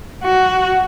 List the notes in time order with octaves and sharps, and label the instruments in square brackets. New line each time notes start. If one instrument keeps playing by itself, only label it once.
[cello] F#4